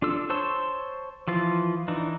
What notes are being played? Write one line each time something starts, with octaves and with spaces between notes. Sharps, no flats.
D4 F4 A4 E6
C5 C#5 A5 C6 E6
E3 F3 F4
E3 D4 D#4